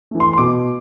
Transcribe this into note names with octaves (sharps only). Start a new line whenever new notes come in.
E3 A3
C6
C6
B2 D6